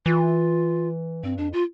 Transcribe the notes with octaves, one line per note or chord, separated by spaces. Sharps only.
E3 F4
G2 C4
F2 D4
F4